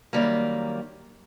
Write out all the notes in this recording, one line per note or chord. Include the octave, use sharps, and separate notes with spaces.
F#2 D#3 G3 A#3